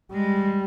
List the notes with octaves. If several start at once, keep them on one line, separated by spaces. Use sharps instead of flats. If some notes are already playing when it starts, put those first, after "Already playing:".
G3 G#3